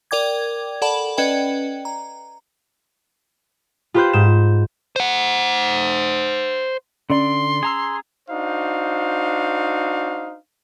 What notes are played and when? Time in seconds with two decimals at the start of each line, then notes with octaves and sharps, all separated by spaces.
0.11 A#4 D5 G5 D6 G#6
0.82 A4 D5 F#5 A5 B5 F#7
1.18 C#4 B4 D5 D#5 G5
1.85 A#5
3.94 F4 G4 B4 C5 F#6 G6
4.13 G#2 G6 E7
4.96 C5 F#5
7.10 D3 C#4 D5 C6
7.63 G#4 A#5 E6
8.29 D4 D#4 F#4 C5 F5